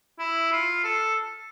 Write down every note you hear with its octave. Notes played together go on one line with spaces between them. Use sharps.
E4
F4
A4